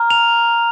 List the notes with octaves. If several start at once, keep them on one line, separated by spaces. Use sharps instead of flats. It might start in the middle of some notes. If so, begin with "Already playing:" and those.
Already playing: A#5 F6
F7